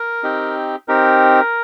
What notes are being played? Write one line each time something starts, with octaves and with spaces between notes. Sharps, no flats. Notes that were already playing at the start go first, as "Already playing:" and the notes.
Already playing: A#4
C4 D#4 G4
C4 D#4 G4 A#4